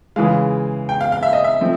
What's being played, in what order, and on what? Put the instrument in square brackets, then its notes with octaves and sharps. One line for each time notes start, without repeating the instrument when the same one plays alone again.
[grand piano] C#3 E3 G#3 [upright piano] F5
[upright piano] G5
F5
F5
E5
D#5
E5
[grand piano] F3 A3 C4